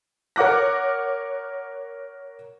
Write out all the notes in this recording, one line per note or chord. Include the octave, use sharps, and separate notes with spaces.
A#4 C#5 F#5 D6 F#6 A#6